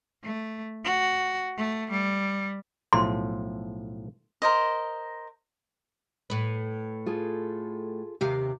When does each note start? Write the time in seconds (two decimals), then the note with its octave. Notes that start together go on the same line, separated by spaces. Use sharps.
0.24 A3
0.84 F#4
1.57 A3
1.91 G3
2.93 B1 A2 F3 C6
4.42 A#4 C5 D#5
6.30 A2 B4
7.06 F4 G#4 A4
8.21 D#2 C3 G4 F5